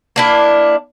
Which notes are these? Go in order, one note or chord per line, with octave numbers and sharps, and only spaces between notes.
A#3 D4 E4